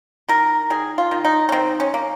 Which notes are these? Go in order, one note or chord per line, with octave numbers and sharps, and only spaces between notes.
D#3 A#4
D#3 G#4
F4
D#3
D#4
C#4
D#3 C4
C#4
A#3